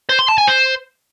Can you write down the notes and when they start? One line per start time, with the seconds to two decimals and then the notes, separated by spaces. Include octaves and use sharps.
0.09 C5
0.19 C6
0.28 A5
0.38 G#5
0.48 C5